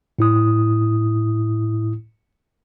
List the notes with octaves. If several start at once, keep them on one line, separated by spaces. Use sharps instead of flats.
A2 E4 D#6